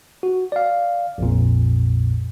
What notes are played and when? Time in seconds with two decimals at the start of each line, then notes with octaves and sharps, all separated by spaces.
0.23 F#4
0.52 D5 F5
1.18 A#1 F2 A#2